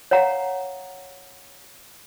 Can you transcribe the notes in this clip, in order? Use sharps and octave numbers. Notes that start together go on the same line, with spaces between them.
C#5 F5 F#5 A#5